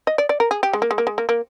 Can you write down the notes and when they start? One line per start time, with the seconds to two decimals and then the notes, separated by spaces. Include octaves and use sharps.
0.07 D#5
0.18 D5
0.29 D5
0.40 A#4
0.51 G#4
0.63 G4
0.73 G#3
0.82 A#3
0.91 G#3
0.98 A#3
1.07 G#3
1.18 A#3
1.29 A#3